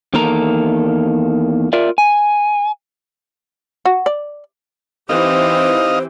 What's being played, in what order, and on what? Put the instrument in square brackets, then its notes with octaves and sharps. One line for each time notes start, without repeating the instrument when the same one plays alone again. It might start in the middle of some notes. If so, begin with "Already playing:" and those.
[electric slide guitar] E2 D#3 A#3 A4 A#5
F4 A#4 D5 E5
G#5
[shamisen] F#4
D5
[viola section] E3 C4 G4 [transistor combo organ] D#4 D#5 F5 [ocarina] C5